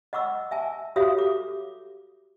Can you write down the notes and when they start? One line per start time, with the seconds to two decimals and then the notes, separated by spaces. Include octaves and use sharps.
0.13 D#5 F#5 C#6 D6 E6
0.51 E5 G#5 A5
0.96 F#4 G4 C#5 E5 F5 D#6
1.17 A4 D6